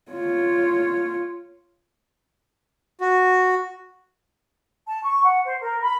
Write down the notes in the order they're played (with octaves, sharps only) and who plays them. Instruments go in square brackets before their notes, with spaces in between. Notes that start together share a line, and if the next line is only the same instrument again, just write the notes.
[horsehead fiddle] F4 C#5
[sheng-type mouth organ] F#4
[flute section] A5
C#6
F#5
C5
A#4
B5